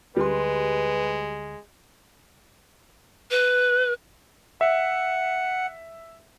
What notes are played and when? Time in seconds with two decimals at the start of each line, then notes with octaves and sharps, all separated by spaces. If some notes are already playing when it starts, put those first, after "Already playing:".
0.17 D2 G3 G#3 B4 C6
3.31 B4
4.61 E5 F#5